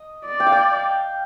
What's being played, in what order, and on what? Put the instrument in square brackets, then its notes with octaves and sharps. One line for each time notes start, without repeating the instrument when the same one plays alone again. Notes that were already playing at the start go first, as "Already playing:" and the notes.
Already playing: [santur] D#5
[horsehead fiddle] D5
[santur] G5
F5
G5